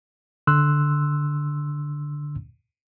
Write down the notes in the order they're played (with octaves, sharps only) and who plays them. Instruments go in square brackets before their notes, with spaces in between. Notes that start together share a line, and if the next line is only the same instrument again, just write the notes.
[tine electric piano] D3 C6 E6 F#6